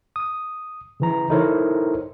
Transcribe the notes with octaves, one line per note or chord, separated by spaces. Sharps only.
D#6
C#3 E3 A#5
D#4 E4 A4 A#4 C5 C#5